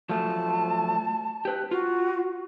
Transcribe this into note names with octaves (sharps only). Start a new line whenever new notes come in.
F3 F#3 A3 A5
G4 B4
F4 F#4